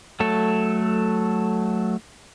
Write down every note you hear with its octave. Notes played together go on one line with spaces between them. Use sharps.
F#3 A3 A4